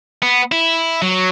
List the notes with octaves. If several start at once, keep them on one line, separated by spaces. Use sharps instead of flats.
B3
E4
F#3